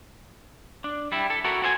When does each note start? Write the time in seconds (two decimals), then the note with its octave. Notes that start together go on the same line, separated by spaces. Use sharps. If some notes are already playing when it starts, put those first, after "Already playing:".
0.84 D4
1.12 G3 E4
1.30 A4
1.44 E4 F#4 A4 A#4
1.62 F#4 A4 C5 E5 G#5